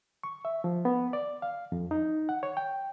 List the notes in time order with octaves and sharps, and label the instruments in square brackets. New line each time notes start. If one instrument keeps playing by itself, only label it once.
[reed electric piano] C#6
E5
F3
B3
D5
F5
F2
D#4
F#5
C#5
G5